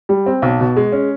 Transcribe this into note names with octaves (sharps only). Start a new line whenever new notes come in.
G3
C4
B1
B2
G#3
C#4